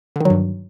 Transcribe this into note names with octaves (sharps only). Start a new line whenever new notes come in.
G2 D3 D#3 F#3